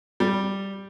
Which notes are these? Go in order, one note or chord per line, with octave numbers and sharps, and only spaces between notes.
G3